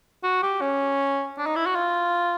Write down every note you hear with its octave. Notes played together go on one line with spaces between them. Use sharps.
F#4
G4
C#4
D4
D#4
E4
F#4
F4